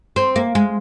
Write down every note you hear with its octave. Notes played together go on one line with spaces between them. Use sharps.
C4
A#3
G#3